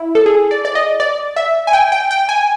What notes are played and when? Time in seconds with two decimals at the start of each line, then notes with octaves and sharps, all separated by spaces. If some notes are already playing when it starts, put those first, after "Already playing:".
Already playing: E4
0.15 A4
0.26 G#4
0.51 D5
0.65 D5
0.75 D#5
1.00 D5
1.36 E5
1.67 G#5
1.73 G5
1.92 G5
2.11 G5
2.29 G#5